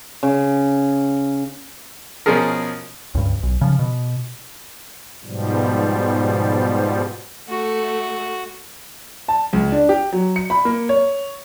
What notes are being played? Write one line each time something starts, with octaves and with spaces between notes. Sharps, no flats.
C#3
B2 F3 C#4 G#4 A#4
C#2 G2
B1
C#3 F3
B2
G#2 B2 F3 G3
A3 F#4
A5
C#2
D4
G4
F#3
C#7
B5
A#3
C#5